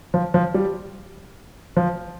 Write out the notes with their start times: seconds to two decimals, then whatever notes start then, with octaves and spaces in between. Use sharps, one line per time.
0.14 F3
0.34 F3
0.54 G3
1.77 F3